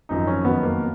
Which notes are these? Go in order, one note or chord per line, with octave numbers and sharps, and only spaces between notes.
G#1 F#2 F3 D#4
C#4
F2 D#3 F#3 B3
A#3